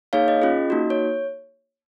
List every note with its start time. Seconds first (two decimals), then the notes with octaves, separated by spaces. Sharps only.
0.13 A#3 D#4 G#4 C#5 F5
0.28 D#5
0.42 C#4 F4 G#4
0.70 A#3 D#4 F#4
0.90 C#5